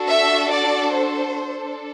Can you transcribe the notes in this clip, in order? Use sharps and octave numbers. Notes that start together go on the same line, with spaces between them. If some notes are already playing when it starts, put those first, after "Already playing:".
Already playing: D4 F#4 A4
E5
D5
C5
D4 A4